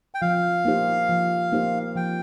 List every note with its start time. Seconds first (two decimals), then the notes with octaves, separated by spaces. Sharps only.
0.15 G5
0.22 F3 F5
0.65 A#3 D#4 G4 C5
1.09 F3
1.52 A#3 D#4 G4 C5
1.96 F3 G5